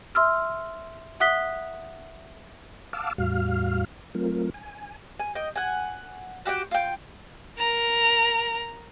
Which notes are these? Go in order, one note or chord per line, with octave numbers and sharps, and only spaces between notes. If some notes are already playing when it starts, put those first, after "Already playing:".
E5 C6 E6 F6
E5 F#5 D#6 F#6 B6 G7
F5 F#5 A5 D6 E6 F6
E2 A2 G3 F#4 F5 F6
F#3 A3 C4 F4 A#4
G#5
G#5
D#5 G5
F#5 G#5
F#4 G4 F#5 G5
F4 G5
A#4 A#5